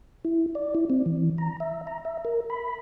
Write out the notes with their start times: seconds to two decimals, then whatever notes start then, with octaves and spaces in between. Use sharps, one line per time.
0.25 E4
0.55 D5
0.75 E4
0.90 C4
1.06 E3
1.38 A#5
1.60 E5
1.87 A#5
2.05 E5
2.25 A#4
2.50 B5